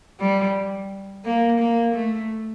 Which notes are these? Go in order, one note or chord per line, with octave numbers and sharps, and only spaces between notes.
G3
A#3
A#3
A3